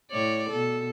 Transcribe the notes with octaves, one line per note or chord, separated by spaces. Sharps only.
A2 C#5 D5
B2 A4